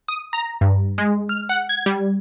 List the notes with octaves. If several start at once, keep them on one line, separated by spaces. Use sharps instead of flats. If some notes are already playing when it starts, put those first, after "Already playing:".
D#6
A#5
G2
G#3
F6
F#5
G#6
G3